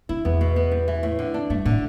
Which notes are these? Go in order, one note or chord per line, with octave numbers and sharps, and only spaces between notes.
D3 E4
E2 B3
B2
B3
G3
E3
A2
D3
D4
G2 A3
A2 D3